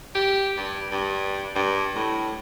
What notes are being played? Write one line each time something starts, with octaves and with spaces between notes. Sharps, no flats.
G4
G2
G2
G2
A2